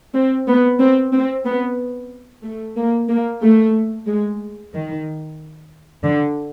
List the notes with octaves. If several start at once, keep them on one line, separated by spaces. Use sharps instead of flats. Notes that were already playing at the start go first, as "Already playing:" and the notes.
C4
B3
C4
C4
B3
A3
A#3
A#3
A3
G#3
D#3
D3